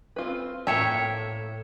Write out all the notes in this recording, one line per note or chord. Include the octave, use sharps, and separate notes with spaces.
C4 F4 B4
A2 A#3 C#5 E5 G5 A5